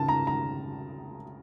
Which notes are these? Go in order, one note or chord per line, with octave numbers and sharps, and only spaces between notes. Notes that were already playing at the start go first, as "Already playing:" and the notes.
Already playing: C#3 A5
A#5
A#5